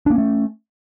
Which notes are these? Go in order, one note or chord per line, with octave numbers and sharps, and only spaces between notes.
A3 A#3 C#4 D4